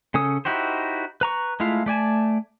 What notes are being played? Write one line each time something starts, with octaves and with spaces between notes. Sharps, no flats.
C#3 C#4 A4 D#6
D#4 E4 F#4 G4 C5
B4 A#5 C#6
G#3 A3 E4 F4 F5
A3 D5 G#5 A5